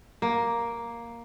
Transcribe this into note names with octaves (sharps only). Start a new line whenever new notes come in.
A#3